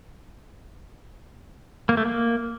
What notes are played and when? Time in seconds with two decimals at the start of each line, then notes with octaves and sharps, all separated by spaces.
1.89 A#3
1.97 A3
2.06 A#3